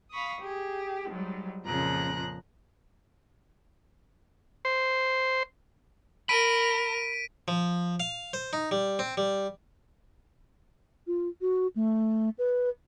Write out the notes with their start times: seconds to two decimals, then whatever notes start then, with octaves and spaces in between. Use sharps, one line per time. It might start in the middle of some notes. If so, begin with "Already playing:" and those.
0.11 F5 B5 C#6 D#6
0.40 G4 G#4
1.09 G#2 F#3 G3
1.63 F2 A#2 C#3 F3 A#5 F#6
4.65 C5
6.29 A#4 B5 B6 D7 D#7
7.48 F3
8.00 F5
8.33 C5
8.53 D#4
8.71 G3
8.99 C4
9.17 G3
11.07 F4
11.41 F#4
11.76 A3
12.38 B4